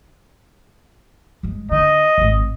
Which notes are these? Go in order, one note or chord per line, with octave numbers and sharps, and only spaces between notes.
G1 G#3
D3 D#5
D1 G#1